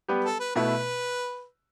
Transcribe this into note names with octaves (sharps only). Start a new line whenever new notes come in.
G3 B3 G4 B4
A4
B4
B2 A3 E4 B4